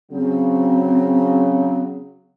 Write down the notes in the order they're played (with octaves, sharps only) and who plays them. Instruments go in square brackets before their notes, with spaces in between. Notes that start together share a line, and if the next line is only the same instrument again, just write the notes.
[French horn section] C#3 F#3 [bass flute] C4